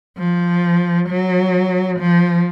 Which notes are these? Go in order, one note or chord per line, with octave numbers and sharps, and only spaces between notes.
F3
F#3
F3